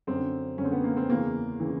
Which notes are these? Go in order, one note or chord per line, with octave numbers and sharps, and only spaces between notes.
F#2 D3 C4
F#2 D3 C4 C#4
B3
A#3
C4
E2 C#3 E3 A#3
C#3 E3